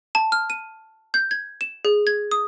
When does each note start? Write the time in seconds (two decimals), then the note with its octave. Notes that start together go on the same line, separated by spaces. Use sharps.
0.15 A5
0.32 F6
0.50 D#7
1.14 G6
1.31 G#6
1.61 E7
1.85 G#4
2.07 G#6
2.31 D#6